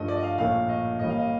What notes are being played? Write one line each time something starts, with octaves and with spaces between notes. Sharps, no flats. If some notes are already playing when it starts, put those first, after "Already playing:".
Already playing: G2 F3 A3 D#5
D5
D#5
F5
A#1 A2 A3 F5
D#5
A1 A2 G3 A#3 D#5
F5
D#5